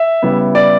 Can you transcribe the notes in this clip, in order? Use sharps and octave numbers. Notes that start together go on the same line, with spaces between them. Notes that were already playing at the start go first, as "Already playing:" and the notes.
Already playing: E5
C#3 G3 B3 E4
D5